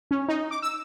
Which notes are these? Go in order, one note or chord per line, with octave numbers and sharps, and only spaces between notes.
C#4
D#4
D6
E6